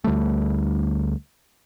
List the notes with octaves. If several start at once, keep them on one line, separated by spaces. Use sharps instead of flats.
D2 D3 G3 A3